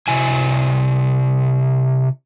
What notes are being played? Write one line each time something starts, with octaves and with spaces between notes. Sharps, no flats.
C3 E4 G#5